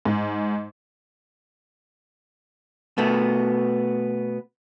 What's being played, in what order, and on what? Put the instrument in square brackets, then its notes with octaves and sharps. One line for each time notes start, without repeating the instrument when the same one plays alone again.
[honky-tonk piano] G#2
[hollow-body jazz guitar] B2 A3 B3